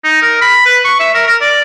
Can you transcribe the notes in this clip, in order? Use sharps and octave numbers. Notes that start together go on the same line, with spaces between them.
D#4
A#4
B5
B4
C#6
E5
A#4
A#4
D5